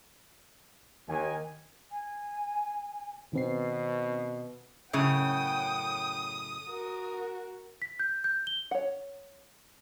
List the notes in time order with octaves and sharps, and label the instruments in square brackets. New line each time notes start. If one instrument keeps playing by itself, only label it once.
[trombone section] D#2 [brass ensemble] D#3 G#5
[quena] G#5
[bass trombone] B2 [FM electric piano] D#3 C4 C7
[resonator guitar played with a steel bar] F#2 A2 C#3 [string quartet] F#5 G5 [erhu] D#6
[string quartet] F#4 A#4
[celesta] B6
G6
G6
G7
[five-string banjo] C#5 F#5